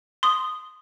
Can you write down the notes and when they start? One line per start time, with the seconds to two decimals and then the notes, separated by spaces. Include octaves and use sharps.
0.23 C6 D#6